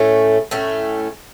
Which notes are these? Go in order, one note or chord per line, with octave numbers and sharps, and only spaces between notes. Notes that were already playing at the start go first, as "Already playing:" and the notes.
Already playing: A2 A3 C#4
A2 A3 C#4